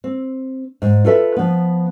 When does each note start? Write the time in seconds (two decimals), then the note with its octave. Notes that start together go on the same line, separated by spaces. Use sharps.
0.04 C4
0.82 G#2
1.05 F4 A4 B4 E5
1.36 F3 B3